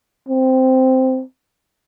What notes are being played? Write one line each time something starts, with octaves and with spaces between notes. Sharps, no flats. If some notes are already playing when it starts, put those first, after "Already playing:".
C4